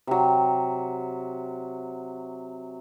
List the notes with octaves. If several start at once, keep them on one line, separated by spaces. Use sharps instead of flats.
C3 F#3